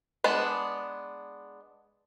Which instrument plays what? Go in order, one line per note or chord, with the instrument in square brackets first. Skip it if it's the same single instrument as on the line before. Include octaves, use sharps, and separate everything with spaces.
[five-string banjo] G#3 B3 D4